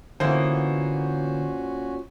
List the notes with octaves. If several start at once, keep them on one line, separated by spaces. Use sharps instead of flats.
A#2 D3 E3 A#3 B3 C#4 F#4 C5